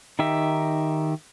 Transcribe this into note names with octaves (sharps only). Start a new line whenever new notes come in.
D#3 D#4 G4 E5